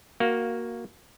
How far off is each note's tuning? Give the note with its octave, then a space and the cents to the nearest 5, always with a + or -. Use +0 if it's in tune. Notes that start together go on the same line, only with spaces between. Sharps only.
A#3 +0 F#4 +0 F5 -5